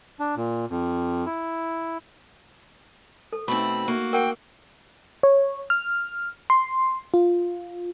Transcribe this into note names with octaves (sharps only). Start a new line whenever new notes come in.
D4
A#2
F2
E4
A4
B2 A3 C4 D#4 B5 C#6
A#3 F#4
A#4 F#5 G5
C#5
F6
C6
F4